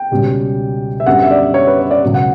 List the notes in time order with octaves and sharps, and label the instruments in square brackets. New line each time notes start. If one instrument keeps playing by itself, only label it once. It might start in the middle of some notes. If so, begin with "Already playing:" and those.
Already playing: [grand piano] G5
C#2 B2 G3 C#4
E5
F#2 D3 G3 B3 F#5
E5
D5
C#5
B4
C#5
D5
C#2 B2 F#3 B3
F#5